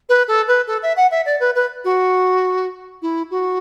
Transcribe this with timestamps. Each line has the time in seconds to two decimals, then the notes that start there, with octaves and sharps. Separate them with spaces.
0.09 B4
0.28 A4
0.47 B4
0.67 A4
0.82 E5
0.96 F#5
1.11 E5
1.25 D5
1.40 B4
1.55 B4
1.84 F#4
3.02 E4
3.31 F#4